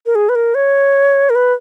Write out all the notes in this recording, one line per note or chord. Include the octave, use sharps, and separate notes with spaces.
A#4
G#4
B4
A#4
C#5
A#4
B4